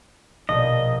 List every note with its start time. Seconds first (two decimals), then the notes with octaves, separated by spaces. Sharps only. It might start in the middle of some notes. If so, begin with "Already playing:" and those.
0.49 A#1 B2 D#5